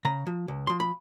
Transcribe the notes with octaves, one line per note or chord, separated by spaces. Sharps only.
C#3 A#5
F3
C#2
F3 C6
B5